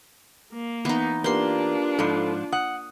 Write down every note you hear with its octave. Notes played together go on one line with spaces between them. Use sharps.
A#3
E2 B3 D#4
A#3 D4 F4 G4 A#4 B4 C6
G#2 F3 A4 B5
F#5 D#6